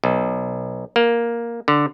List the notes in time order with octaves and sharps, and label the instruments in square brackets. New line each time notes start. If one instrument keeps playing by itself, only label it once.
[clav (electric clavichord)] B1
A#3
D3